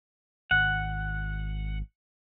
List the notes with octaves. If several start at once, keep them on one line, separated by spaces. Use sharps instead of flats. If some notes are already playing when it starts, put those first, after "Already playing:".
G#1 F#5